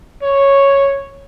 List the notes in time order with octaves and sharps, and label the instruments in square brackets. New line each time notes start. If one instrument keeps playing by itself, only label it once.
[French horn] C#5